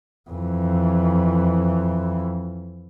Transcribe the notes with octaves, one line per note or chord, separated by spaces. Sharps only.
F2 E3